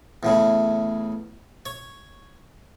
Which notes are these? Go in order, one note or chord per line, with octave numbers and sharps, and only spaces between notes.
E2 A2 C#3
C#5